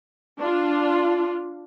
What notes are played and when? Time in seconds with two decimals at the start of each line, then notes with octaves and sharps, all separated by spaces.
0.38 D4 F4